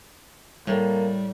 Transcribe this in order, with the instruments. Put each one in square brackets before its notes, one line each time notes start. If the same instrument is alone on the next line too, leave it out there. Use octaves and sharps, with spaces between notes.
[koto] A2 [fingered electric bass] G3 [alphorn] A#3